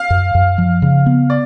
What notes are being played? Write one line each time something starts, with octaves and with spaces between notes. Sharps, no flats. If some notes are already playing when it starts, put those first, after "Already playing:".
Already playing: F5
F#2
F#2
F3
C#3
B3
D5